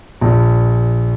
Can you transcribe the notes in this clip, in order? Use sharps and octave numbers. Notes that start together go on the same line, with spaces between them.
A#1